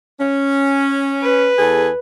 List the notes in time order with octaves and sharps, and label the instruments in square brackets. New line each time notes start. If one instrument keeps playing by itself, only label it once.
[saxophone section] C#4
[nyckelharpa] B4
[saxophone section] E2 G#4 A4